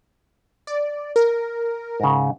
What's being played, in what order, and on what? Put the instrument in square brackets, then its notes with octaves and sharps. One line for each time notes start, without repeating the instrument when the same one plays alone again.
[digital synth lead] D5
A#4
[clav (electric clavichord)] G#2 C#3